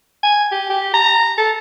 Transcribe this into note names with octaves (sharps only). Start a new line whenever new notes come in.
G#5
G4
G4
A#5
A4